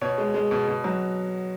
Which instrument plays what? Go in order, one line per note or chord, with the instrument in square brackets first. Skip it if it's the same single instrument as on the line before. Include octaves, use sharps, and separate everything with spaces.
[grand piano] B2 C#5
G#3
G#3
B2
B2
F#3